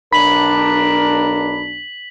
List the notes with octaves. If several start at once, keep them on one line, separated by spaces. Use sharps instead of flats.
B1 D4 A#4 B5 B6 F#7